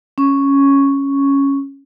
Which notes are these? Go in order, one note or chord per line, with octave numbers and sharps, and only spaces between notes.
C#4 C#6